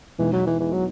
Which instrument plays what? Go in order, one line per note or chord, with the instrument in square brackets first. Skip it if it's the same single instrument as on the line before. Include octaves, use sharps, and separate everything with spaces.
[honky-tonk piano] E2 B2 G#3 D#4 [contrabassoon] E3
[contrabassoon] F#3
E3
E3
F#3